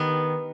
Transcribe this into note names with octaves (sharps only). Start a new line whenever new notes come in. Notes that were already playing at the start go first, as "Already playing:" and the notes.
Already playing: D#3 B3 G4